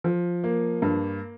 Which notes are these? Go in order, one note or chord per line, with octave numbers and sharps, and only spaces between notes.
F3
A#3
G2